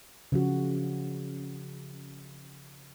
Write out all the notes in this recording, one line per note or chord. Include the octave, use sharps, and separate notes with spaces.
C#3 F3 F#4